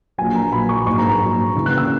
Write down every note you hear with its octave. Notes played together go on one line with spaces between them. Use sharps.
A#1 A#2 F#3 G#5
A#5
A#1 A#2 F#3 B5
C#6
A#1 G#2 F#3 C#6
A#5
A#5
A#1 G#2 F#3
D#2 C#3 E3
F#6
E6